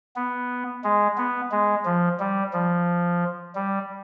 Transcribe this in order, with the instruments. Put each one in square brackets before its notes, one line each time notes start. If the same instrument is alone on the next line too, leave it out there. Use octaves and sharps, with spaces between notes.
[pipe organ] B3
G#3
B3
G#3
F3
G3
F3
G3